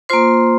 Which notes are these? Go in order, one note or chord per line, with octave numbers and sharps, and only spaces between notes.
A#3 F4 C5 C6